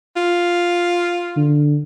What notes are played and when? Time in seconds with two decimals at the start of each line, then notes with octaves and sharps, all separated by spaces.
0.16 F4
1.37 D3